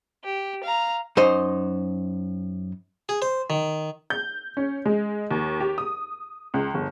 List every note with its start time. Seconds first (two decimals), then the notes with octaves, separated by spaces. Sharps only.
0.24 G4
0.63 F5 A#5
1.17 F#2 D#4 C5 D#5
3.09 G#4
3.22 C5
3.50 D#3
4.10 G6
4.57 C#4
4.85 G#3
5.31 D#2
5.60 G4
5.78 D#6
6.54 C#2
6.74 G1